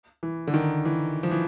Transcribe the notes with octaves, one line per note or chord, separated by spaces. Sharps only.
E3
D3
D#3
E3
F3
E3